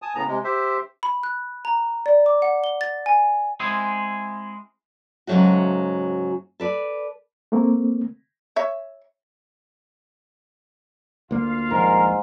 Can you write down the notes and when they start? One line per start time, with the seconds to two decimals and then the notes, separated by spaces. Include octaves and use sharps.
0.02 G#5 A5 D#6
0.15 A2 C#3 B3 A#5
0.28 C3 G#3
0.44 G4 C5 E5
1.03 B5
1.23 F#6
1.65 A#5
2.06 D5
2.26 D6
2.42 F#5
2.64 G7
2.81 A6
3.06 G#5
3.60 G#3 C4 E4 G#4
5.27 G#2 C#3 F3 F#3 A3 F#4
6.60 A4 B4 D5
7.52 A3 A#3 C4
8.56 C#5 E5
11.31 D2 A#3 F4 F5
11.70 D#1 A#1 G#2 A#4